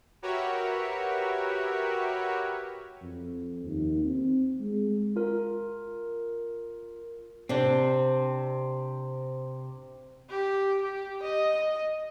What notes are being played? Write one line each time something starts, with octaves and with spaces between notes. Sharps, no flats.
F#4 G4 A#4 B4 C#5 E5
F2
D#2
C4
G#3
F4 A#4
C3 C4 D4
G4
G4
D#5